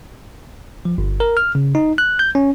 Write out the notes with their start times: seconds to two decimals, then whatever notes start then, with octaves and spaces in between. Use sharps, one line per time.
0.85 F3
0.98 G1
1.20 A#4
1.37 F6
1.55 C#3
1.75 D#4
1.98 F#6
2.19 G6
2.35 C#4